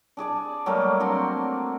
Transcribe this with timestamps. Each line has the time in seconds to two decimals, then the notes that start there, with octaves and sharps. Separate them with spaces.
0.17 D4 G#4 D5 A5
0.66 F#3 G3 A3 A#3
1.00 C4 D4 F#4 C6